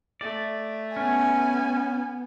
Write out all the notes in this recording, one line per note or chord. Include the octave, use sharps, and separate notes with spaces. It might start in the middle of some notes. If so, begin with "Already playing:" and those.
A3 D5
B3 C#4 G#5